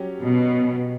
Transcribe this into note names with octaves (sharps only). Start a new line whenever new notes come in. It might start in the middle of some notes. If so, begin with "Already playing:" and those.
Already playing: F#3 C#4 G4
B2